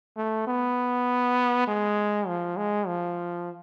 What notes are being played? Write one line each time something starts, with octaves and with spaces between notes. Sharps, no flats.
A3
B3
G#3
F3
G#3
F3